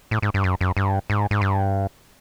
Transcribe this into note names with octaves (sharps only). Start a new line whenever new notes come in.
A2
G#2
G2
F#2
F#2
G2
G#2
G#2
G2